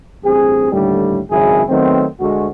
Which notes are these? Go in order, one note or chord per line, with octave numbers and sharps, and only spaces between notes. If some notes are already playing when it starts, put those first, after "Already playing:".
A1 G2 C4 G#4
D#2 A2 D3 G3
G#1 F#2 C#3 G#3 E4 G#4
D#3 F#3 A3 B3 C4
D2 G#3 F#4